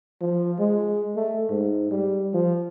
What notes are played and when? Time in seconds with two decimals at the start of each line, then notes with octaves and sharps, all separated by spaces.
0.21 F3
0.59 G#3
1.16 A3
1.50 G#2
1.91 G3
2.34 F3